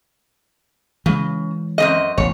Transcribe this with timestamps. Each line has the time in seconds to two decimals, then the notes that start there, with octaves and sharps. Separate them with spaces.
1.06 C#3 E3 G#3
1.78 F#2 C4 D#5
2.18 E1 A1 C#5